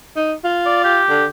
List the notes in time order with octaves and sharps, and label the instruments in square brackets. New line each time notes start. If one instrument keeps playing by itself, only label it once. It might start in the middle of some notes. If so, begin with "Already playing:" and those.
[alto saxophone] D#4
F4
[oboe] D5
G4
[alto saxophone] D3